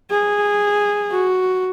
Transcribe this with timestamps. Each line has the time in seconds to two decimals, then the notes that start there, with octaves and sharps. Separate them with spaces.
0.10 G#4
1.11 F#4